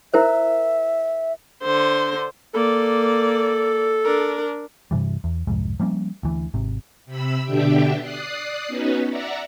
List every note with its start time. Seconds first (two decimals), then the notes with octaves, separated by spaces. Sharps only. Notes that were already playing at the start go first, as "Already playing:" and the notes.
0.14 E4 A#4 C5 E5
1.63 D3 C5
2.54 A#3 A4 D5
4.04 D4 A#4
4.91 G2 C3 E3 G3
5.24 E2
5.47 C2 F2 G#2
5.80 F3 G3 A#3 C#4
6.23 D2 E3
6.54 G#1 C3
7.06 C3 B5 E6
7.43 B2 D3 D4 G4 E5 G5
8.00 D5 D#6 F#6 C7
8.68 B3 C#4 D#4 F#4 B4
9.09 D5 E5 F#5 A#5